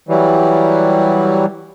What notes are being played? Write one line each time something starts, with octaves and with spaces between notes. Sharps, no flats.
E3 F#3 G3